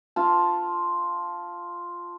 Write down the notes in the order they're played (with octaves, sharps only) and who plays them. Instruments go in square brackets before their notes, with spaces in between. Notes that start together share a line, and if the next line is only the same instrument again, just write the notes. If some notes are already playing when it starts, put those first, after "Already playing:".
[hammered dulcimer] F4 A5